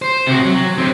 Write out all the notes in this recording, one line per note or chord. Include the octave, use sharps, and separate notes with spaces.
C5
C3 F#4
F#3
D3 C4